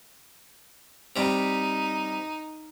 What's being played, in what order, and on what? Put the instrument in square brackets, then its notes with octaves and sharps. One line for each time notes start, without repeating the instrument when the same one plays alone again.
[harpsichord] C3 G3 [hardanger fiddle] D#4